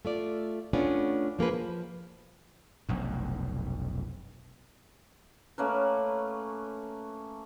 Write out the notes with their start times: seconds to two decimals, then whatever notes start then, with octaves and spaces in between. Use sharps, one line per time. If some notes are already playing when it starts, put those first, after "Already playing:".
0.05 A3 F4 D5
0.73 A3 B3 C#4 D4 F4
1.39 F3 A#3 G#4 B4
1.53 F3
2.89 F1 B1 G2
5.58 A3 A#3 C#4 B4